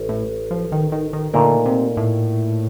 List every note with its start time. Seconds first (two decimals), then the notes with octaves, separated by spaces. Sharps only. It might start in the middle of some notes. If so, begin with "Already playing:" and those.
Already playing: A1
0.09 A2
0.51 F3
0.72 D#3
0.92 D#3
1.13 D#3
1.34 A#2 D3 A3 D#4 A#4
1.66 C3
1.97 A2